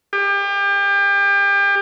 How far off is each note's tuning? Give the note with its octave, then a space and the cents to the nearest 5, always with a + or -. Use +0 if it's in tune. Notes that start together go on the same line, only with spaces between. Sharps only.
G4 +35